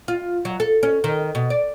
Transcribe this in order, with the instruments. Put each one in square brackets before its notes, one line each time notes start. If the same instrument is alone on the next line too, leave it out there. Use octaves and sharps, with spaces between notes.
[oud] F4
F#3
A4
C#4
D#3
B2
D5